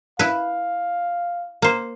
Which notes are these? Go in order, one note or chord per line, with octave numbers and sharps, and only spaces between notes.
E4 B4 F5
A#3 C5